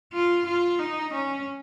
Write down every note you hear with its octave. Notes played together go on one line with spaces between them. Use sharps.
F4
F4
D#4
C#4